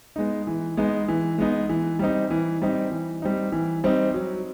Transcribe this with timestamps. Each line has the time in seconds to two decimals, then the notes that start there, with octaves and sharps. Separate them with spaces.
0.16 G#3 B3 D#4
0.47 E3
0.77 G#3 B3 D#4
1.08 E3
1.38 G#3 B3 D#4
1.69 E3
1.99 G3 C4 D#4
2.31 E3
2.62 G3 C4 D#4
2.92 E3
3.22 G3 C4 D#4
3.52 E3
3.84 G3 C4 D#4
4.14 F#3